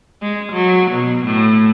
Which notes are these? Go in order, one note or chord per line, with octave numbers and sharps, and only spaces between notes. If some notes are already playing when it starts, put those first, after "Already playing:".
G#3
F#3
B2
A2